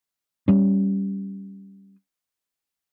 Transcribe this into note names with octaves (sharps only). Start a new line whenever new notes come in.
G3 C#4